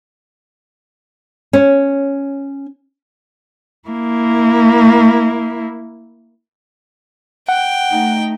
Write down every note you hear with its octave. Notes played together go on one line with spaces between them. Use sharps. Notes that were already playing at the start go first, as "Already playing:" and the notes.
C#4
A#3 E4
F#5 G5
A3 D#4